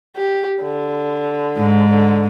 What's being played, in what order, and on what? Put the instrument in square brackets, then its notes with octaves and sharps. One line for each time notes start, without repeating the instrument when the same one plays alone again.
[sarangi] G4
D3
[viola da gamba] G#2
[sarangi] D3